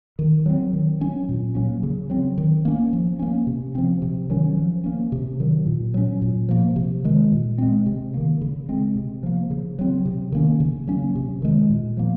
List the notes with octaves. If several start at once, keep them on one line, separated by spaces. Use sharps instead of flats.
D#3
F#3 C4
D#3
F#3 C#4
A#2
F#3 A#3 C#4
C#3
F#3 C4
D#3
A#3 C#4
F3
A#3 C#4
C3
F3 C4
C3
D#3 F#3 C#4
F3
A#3 C#4
C3
D#3 F#3
A#2
F#3 C#4
A#2
F3 A#3
C3
D#3 G#3
A#2
G#3 C4
C3
D#3 A#3
C#3
G#3 C4
C3
F3 A#3
C#3
F#3 C4
C3
D#3 A#3 C#4
C#3
F#3 A#3 C#4
C3
D#3 G#3
A#2
F3 A#3